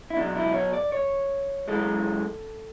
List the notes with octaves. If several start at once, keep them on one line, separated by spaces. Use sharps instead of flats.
E4
B2 F#3 D4
E4
C#5
D5
C#5
F#2 E3 G#3 A4